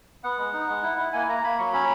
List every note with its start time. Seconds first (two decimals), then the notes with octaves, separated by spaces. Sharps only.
0.24 B3 F#5
0.38 G#3
0.54 D#4
0.69 G#3
0.83 E4
0.98 E4
1.13 A#3 G#5
1.28 A#3 A#5
1.43 A#3 B5
1.59 F#3 C#6
1.73 C#4 B5